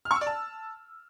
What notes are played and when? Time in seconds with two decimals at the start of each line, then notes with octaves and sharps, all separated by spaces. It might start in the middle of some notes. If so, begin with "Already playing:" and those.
0.05 F6
0.11 C#6
0.16 E6
0.21 D5
0.27 A5